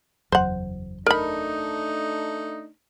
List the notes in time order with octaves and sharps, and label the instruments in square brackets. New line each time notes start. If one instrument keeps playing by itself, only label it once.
[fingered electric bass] F#1 E2 F#3 [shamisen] C5 F#5
[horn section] A3 D4 D#4 [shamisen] A#4 B5